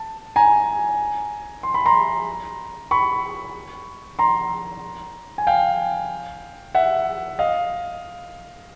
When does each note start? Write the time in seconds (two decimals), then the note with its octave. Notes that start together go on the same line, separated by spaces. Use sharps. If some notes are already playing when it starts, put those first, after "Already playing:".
Already playing: A5
0.36 G#5 A#5
1.63 C6
1.74 B5
1.86 A#5 C6
2.91 B5 C#6
4.19 A#5 C6
5.38 G#5
5.47 F5 G5
6.75 E5 F#5
7.39 D#5 F5